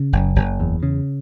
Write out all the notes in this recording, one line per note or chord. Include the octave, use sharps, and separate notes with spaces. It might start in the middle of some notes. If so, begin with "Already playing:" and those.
Already playing: C#3
F#1
F#1
E2
C#3